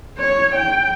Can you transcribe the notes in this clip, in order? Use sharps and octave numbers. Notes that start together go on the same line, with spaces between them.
C#5
G5